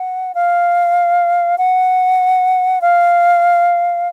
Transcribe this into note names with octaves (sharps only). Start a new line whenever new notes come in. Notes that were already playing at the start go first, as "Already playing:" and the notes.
Already playing: F#5
F5
F#5
F5